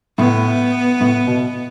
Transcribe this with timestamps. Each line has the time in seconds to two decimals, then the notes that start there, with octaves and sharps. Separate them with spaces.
0.18 A2 B3
1.01 A2
1.27 B2